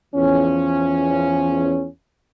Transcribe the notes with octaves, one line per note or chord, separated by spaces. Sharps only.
E2 F3 C#4